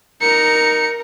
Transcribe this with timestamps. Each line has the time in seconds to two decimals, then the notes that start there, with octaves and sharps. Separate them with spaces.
0.22 D#4 A#4 C#7